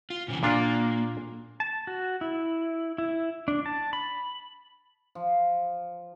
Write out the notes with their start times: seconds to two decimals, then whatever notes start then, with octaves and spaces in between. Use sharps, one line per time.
0.10 F4
0.28 A#2 C#3 E3
0.43 A#2 A#3 D4 F4
1.60 A5
1.87 F#4
2.21 E4
2.98 E4
3.48 D4
3.66 A5
3.93 B5
5.15 F3